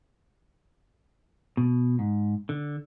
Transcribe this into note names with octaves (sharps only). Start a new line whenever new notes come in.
B2
G#2
D3